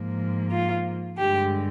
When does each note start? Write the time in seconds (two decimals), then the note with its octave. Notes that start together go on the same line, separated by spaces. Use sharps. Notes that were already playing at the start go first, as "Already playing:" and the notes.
Already playing: G#2 F3 A#3
0.51 F4
1.18 G2 D3 G#3 G4